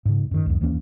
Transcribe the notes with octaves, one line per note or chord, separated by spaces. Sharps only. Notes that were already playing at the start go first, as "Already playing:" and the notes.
G#2 C#3
F#2 D#3
C#2 F#2
D#2 E3 A#3 C#4